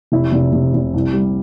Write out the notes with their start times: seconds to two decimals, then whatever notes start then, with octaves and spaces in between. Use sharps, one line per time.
0.12 F1 E4
0.32 F1
0.53 F1
0.74 F1
0.94 C2
1.14 G3